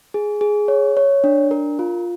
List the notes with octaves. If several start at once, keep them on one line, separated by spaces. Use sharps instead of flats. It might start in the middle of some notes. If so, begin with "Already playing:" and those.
G#4
G#4
C#5
C#5
D4
A#4
F4